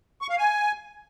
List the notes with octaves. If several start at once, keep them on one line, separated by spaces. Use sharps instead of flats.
C#6
F5
G#5